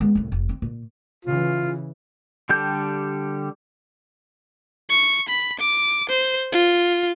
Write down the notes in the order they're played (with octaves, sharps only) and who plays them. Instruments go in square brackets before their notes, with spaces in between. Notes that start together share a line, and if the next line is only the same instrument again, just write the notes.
[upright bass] G#3 B3
C2 A2
F1
C4
A#2
[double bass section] C#3 E3 [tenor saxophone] F4
[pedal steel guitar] D3 G3 G4 A4 G6
[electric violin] C#6
B5
D6
C5
F4